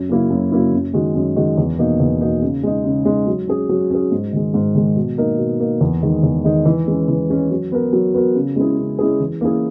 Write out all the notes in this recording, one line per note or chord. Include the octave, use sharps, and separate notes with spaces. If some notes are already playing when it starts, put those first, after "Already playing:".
Already playing: F#2
C#3 F#3 A#3 E4
F#2
C#3 F#3 A#3 E4
F#2
D#3 G#3 D#4 F#4
F#2
D#3 G#3 D#4 F#4
E2
B2 A#3 D#4
E2
B2 A#3 D#4
C#3
G#3 D#4
C#3
G#3 D#4
F#3
C#4 G#4
F#3
C#4 G#4
G#2
D#3 G#3
G#2
D#3 G#3
B2
A#3 D#4 A#4
B2
A#3 D#4 A#4
E2
D#3 G#3 D#4
E2
D#3 G#3 D#4
E3
G#3 C#4
E3
G#3 C#4
F#3
B3 F#4 A#4
F#3
B3 F#4 A#4
C#3
G#3 C#4 E4 G#4
C#3
G#3 C#4 E4 G#4
E3
A#3 C#4 E4 G#4